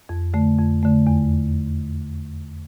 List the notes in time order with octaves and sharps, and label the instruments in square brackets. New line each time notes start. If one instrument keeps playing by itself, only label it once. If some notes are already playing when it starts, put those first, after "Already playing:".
[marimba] F2
D3 A3
F2
D3 A3
E2